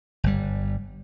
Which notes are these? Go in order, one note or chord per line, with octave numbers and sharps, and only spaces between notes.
G1 G3